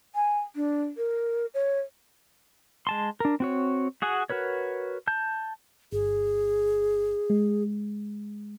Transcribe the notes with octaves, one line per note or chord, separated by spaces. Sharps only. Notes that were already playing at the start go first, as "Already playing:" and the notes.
G#5
D4
A#4
C#5
G#3 A5 C6
D4 A#4
C4 F#4 C#5
F#4 G#4 F#5 G#5
F#4 A#4 B4 C#5
A5 G6
G1 G#4
G#3